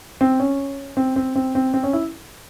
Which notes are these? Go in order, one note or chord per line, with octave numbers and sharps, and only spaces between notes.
C4
C#4
C4
C4
C4
C4
C4
C#4
E4